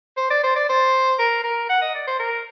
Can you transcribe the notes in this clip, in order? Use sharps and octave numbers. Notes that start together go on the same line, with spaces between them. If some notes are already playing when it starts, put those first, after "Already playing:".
C5
D5
C5
D5
C5
A#4
A#4
F#5
D#5
D5
C5
A#4